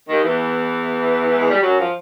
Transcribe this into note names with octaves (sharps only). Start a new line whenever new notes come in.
D#2 D#3
E2 E3
G#3
G3
F#2 F#3
F3